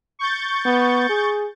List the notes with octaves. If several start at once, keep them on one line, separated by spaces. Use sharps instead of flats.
C#6 G6 A6
B3
G#4